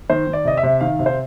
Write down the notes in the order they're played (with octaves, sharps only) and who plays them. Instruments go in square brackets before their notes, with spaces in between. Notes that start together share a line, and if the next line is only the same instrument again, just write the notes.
[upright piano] D#3 C5
D#3
D5
C3 D#5
E5
C3
D#3 F5
C3
C5